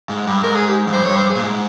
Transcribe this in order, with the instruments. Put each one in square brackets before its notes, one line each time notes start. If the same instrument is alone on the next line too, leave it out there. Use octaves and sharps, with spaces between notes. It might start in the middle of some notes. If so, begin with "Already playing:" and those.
[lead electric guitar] G#2
G2
[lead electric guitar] G#2 [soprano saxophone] A#4
[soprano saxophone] G#4
G4
[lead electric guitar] F2
[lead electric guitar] G2 [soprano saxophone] C5
[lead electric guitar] F2
[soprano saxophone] C#5
[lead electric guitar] G2
[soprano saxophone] C5
G#4
[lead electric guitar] A#2
G#2